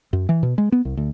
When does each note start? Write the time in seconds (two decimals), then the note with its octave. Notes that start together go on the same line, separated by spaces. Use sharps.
0.13 F#2
0.29 E3
0.43 B2
0.58 G#3
0.72 B3
0.85 C2
0.97 D2